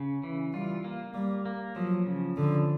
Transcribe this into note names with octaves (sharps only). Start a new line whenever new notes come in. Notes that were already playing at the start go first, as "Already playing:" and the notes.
Already playing: C#3
E3
G3 F4
A#3
G3 A#3
A#3
F3 F#3
C#3
D3 F3